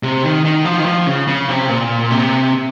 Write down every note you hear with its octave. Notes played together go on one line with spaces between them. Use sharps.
C3
D#3
D#3
F3
D#3
F3
C#3
C#3
C3
A#2
C3